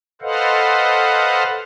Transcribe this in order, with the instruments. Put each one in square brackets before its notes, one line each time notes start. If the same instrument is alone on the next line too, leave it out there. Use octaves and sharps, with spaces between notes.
[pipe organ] A4 B4 C5 D#5 F5 F#5